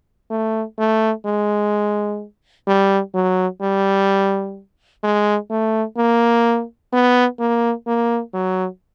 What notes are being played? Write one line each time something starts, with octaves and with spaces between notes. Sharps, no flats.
A3
A3
G#3
G3
F#3
G3
G#3
A3
A#3
B3
A#3
A#3
F#3